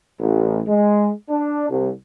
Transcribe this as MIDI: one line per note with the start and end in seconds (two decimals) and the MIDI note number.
0.19 0.61 33
0.68 1.10 56
1.30 1.65 62
1.70 1.90 36